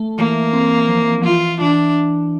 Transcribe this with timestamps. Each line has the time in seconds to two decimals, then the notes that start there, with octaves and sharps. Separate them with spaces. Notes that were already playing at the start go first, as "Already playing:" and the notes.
Already playing: A3
0.18 E3 A#3
0.53 C4
0.89 F3
1.25 E3 F4
1.61 E3 D4